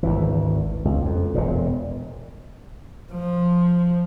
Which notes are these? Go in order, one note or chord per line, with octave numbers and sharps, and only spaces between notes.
G#1 D2 E3
C#2
F2
E1 A#2
F3